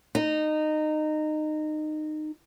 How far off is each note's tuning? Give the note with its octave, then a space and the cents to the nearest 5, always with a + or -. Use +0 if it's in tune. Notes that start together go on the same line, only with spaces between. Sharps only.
D#4 -20